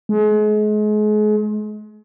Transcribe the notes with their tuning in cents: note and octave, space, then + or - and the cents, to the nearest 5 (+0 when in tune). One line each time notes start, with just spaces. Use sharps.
G#3 +35